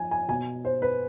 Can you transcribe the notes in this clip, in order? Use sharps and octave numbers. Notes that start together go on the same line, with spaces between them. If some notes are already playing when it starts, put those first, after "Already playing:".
Already playing: F3 G#5
G#5
B2 G#5
C5
B4